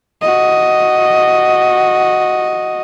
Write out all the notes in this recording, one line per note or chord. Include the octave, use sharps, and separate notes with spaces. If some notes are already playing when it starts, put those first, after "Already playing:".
F#4 D#5